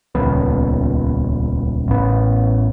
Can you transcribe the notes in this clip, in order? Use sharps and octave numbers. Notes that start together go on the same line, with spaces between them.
D#1 C#2 B3
A1 B3